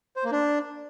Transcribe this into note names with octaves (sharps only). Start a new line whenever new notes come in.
C5
A#3
D4